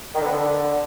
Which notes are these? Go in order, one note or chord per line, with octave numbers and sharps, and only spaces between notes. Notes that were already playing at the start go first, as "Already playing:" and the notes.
D#3
D3
B3
D3